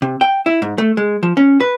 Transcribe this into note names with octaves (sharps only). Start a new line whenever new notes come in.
C3
G5
E4
G#2
A3
G#3
F3
C#4
B4